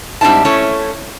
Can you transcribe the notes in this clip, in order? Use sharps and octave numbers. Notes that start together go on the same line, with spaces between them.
G#2 G3 C4 D4 E4 A5
A3 C#4 E4 C#5